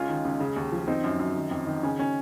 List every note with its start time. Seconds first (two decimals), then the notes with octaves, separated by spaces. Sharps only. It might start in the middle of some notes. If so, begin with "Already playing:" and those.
Already playing: C#2 C#4 F4
0.09 D#3
0.25 C#2
0.40 C#3
0.56 D#2
0.72 F3
0.88 D#3 C4 D#4
1.04 F#2
1.19 F#2
1.36 D#3
1.51 F2
1.67 D#3
1.83 C#3 C#4
1.99 C#4